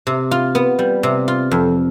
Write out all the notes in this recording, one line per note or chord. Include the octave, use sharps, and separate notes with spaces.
C3
F4
B3
G3
C3
F4
F2